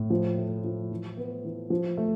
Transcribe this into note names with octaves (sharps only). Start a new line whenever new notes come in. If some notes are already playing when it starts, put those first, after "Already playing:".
Already playing: A2
F3
A3
F3
E3
B3
E3
F3
A3